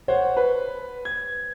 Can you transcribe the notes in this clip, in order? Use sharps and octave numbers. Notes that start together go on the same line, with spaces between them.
C5 C#5 F#5
B4
G#6